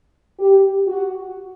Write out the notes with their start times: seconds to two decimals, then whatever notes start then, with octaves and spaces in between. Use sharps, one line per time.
0.39 G4
0.88 F#4